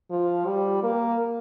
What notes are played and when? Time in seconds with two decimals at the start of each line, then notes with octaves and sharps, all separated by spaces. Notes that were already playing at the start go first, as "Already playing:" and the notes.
0.11 F3
0.46 G3
0.83 A#3